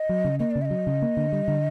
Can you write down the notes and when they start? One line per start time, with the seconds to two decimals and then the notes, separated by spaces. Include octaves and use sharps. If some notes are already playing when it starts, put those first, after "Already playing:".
Already playing: D#5
0.09 F#3
0.24 C#3
0.39 A#3 D#5
0.51 C#3 D5
0.62 E5
0.65 D#5
0.70 F#3
0.87 C#3
1.02 A#3
1.17 D3
1.32 G3
1.48 D3